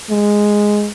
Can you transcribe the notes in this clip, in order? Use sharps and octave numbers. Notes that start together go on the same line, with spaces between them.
G#3